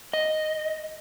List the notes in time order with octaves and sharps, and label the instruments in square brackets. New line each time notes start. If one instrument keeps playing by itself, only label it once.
[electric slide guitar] D#5